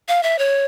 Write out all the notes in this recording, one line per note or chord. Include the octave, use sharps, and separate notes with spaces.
F5
E5
C#5